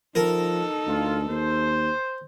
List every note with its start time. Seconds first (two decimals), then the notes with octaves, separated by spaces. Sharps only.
0.15 F3 D#4 A4 A#4
0.87 D2 F4
1.29 D#2 C5